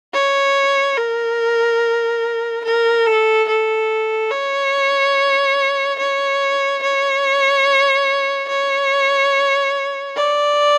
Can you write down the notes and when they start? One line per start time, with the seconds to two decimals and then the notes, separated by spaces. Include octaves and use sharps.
0.14 C#5
0.97 A#4
2.64 A#4
3.06 A4
3.48 A4
4.31 C#5
5.98 C#5
6.82 C#5
8.49 C#5
10.16 D5